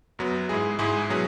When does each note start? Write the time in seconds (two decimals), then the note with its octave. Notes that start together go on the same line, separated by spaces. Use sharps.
0.19 F#2 F#3 B3
0.49 G#2 G#3 E4 G#4
0.79 G#2 G#3 E4 G#4
1.09 B2 F#3 C#4 G#4